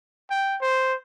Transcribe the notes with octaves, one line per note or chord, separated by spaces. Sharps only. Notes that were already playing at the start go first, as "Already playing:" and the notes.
G5
C5